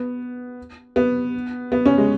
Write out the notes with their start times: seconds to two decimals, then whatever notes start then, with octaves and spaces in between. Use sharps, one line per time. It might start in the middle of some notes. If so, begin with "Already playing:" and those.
Already playing: B3
0.96 B3
1.72 B3
1.86 C#4
1.98 G#3